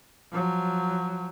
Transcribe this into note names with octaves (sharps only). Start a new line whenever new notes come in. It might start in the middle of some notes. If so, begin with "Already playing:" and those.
F3 F#3